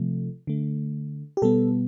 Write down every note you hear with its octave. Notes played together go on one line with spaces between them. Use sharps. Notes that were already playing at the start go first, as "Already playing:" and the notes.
Already playing: C3 F3 A3
D3 A3
G4
B2 G3 B3 A4